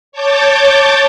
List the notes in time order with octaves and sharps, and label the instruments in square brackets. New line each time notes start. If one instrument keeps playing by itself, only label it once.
[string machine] C#5 A5 D6 G6 A6